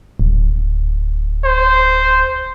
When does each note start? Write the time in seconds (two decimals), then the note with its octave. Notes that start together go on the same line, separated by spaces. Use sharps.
0.19 D1
1.44 C5